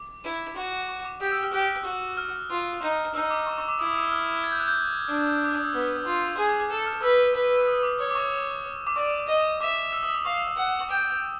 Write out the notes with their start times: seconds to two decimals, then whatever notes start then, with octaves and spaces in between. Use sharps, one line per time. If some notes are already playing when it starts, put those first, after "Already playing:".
Already playing: D6
0.24 E4
0.57 F#4
0.89 C#6
1.04 D6
1.21 G4 D#6
1.32 E6
1.43 F6
1.53 G4 F#6
1.85 F#4
2.17 F6
2.51 F4
2.82 D#4
3.14 D#4 E6
3.30 D6
3.47 C#6
3.58 C#6
3.68 D6
3.79 E4 D#6
3.95 E6
4.12 F6
4.44 G#6
4.52 G6
4.59 F#6
4.67 G6
5.09 D4
5.44 D6
5.54 D#6
5.63 E6
5.73 B3 F6
6.05 F4
6.37 G#4 E6
6.48 D6
6.59 D6
6.70 A4
6.86 F6
7.02 B4 E6
7.35 B4
7.61 E6
7.67 D#6
7.83 D6
7.99 C#5 D#6
8.10 D6
8.15 C#6
8.87 D6
8.96 D5 C#6
9.28 D#5
9.61 E5 D6
9.93 E6
10.03 D#6
10.15 D6
10.25 F5 C#6
10.57 F#5
10.81 C#6
10.89 G5 D6